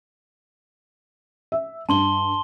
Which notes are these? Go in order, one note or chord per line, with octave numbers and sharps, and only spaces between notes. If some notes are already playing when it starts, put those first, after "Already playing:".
E5
G2 A5 C6 G7